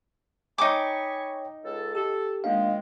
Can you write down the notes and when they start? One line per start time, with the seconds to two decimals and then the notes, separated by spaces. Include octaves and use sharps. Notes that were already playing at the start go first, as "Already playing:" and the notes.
0.58 D#4 C#5 G5 G#5 A#5 B5 C#6 D6
1.63 C#2 A4
1.95 G4 A4
2.44 D#3 F3 G#3 A#3 D4 F5